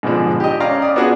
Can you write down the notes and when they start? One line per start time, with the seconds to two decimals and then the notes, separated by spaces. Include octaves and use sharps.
0.03 G#2 B2 D3 F3 D4
0.40 G4 D#5
0.60 C#4 D5 F5 A#5
0.82 D5 D#6
0.96 B3 D4 F4 F#4 G#4